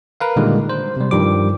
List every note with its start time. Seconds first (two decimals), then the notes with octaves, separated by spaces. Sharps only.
0.21 A#4 B4 F5
0.36 A#2 D3 D#3 G3 G#3 A#3
0.70 C5
0.97 C3 G3
1.11 G2 D#3 F3 G3 D6